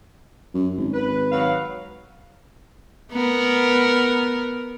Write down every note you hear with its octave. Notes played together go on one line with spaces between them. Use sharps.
F#2
G#1
B4
F#3 B4 F5
B3 A#4